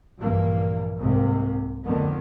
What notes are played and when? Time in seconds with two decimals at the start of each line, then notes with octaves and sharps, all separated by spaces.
0.19 A#1 G2 E3 G3 A#3
0.97 C2 G#2 C3 A#3
1.85 F2 D3 D#3 A3 B3